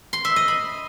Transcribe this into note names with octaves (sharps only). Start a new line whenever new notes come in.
C6
E5
D#5
B5